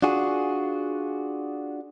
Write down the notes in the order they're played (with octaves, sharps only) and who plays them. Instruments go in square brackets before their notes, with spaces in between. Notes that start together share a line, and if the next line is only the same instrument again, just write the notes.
[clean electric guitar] D4 F4 F#4 G#4